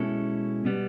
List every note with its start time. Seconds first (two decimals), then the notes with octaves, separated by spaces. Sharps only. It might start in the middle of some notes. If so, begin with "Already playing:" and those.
Already playing: B2 G#3 C#4 E4 A4
0.65 B2 G3 B3